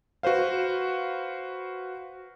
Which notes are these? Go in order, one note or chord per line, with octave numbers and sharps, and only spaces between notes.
F#4 B4 C5 F5